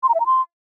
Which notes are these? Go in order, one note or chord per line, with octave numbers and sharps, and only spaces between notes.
C6
A#5
E5
A#5
C6